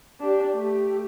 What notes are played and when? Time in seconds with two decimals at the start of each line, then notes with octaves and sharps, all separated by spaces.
0.20 D4 G4
0.54 A3 G4